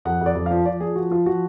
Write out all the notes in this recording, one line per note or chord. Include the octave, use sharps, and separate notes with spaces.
F2 F#5
F2 D5
F2
F3 F5
F3 D5
F3 G#4
F3 F#4
F3 F4
F3 F#4